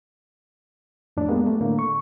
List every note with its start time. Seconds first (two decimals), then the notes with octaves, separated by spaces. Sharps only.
1.17 F2 A2 D4
1.29 G3 G#3 A#3 B3
1.46 A3
1.61 A2 D3 A#3
1.79 C#6